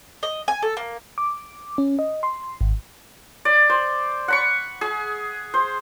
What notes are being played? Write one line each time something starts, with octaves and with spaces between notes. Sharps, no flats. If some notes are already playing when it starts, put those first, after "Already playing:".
D#5
G#5
A4
A#3
D6
C#4
D#5
C6
G#1
D5
C5
F#5 B5 C#6
G#4
C5